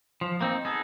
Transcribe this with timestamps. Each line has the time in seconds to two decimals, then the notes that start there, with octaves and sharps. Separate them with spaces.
0.21 F3
0.41 A#3 C4 D#4
0.65 B3 D#4 G#4 A4